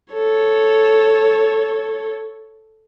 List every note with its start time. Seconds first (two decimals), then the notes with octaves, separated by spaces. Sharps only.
0.13 A4 C#5